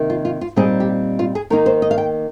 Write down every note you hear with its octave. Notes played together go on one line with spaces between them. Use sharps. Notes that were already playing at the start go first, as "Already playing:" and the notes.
Already playing: C3 D#3 A#3 D#4
F4
F4
F4
A#2 G3 C4 D#4 G#4
G4
F4
G#4
D#3 A#3 D#4 A#4
C5
D#5
F5
G5